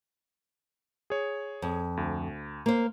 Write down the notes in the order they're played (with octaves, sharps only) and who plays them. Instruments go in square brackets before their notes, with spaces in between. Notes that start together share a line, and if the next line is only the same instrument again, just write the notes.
[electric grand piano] G#4 C#5
[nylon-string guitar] F2
[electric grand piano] D2
[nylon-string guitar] A#3 C5